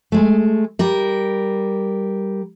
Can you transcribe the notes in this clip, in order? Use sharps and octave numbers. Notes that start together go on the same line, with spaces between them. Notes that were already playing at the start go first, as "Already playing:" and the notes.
G#3 A3
G3 A#4